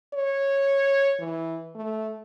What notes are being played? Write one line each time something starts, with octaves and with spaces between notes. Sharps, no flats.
C#5
E3
A3